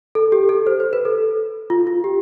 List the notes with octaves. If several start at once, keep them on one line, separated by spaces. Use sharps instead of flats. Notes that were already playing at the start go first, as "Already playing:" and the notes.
A4
G4
A4
C5
C5
B4
A4
F4
F4
G4